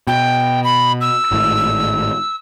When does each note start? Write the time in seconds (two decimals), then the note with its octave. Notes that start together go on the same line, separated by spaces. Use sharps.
0.07 B2 G5
0.64 B5
1.01 E6
1.31 G#1 A2